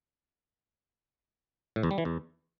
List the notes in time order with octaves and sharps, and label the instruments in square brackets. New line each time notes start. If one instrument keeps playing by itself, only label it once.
[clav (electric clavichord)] A2
E2
G3
E3
E2